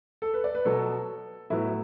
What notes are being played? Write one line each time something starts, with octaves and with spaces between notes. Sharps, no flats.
A4
B4
D5
B4
B2 F#3 B3 A4
A2 F#3 B3 E4